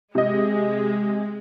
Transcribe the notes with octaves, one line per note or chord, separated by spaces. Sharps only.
C3 G#3 D#5